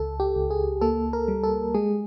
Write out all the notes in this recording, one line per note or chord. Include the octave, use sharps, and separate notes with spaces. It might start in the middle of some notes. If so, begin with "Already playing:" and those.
Already playing: C#2 A4
G4
C#2
G#4
A#3 A4
A#4
G3
A4
G#3 G#4